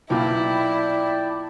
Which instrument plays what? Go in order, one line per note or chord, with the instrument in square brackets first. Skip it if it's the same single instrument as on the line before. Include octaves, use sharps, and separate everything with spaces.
[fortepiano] B1 A#2 [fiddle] E4 [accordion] D5 G5 A5